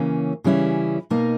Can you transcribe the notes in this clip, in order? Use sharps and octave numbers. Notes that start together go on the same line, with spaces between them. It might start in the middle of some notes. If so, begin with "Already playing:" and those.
Already playing: C#3 E3 A#3 C#4
C#3 E3 G3 C#4 E4
B2 A#3 D#4